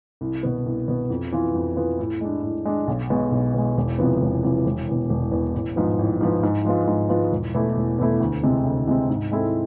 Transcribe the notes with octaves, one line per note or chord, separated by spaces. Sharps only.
C2
B2 B3
C2
B2 B3
F2
E3 B3 F4
F2
E3 B3 F4
A2
G#3 D4
A2
G#3 D4
B1
B2 G#3
B1
B2 G#3
E1
E2 C3 F3 B3
E1
E2 C3 F3 B3
E1
E2 B2
E1
E2 B2
A1
G#2 F3 B3
A1
G#2 F3 B3
G#2
F3 G#3 B3 F4
G#2
F3 G#3 B3 F4
E1
E2 B2 A3 E4
E1
E2 B2 A3 E4
D2
C3 G#3 C4
D2
C3 G#3 C4
G#2
G#3 C4 E4 A4